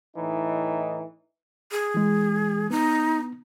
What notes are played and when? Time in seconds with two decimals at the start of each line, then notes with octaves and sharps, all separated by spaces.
0.17 A2 E3 D#4
1.71 G#4
1.94 E3 G#3
2.71 B3 D#4